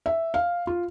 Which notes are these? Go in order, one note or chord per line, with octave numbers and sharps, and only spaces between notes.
E5
F5
F4